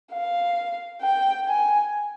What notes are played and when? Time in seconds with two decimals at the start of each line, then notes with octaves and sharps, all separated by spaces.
0.12 F5
1.01 G5
1.47 G#5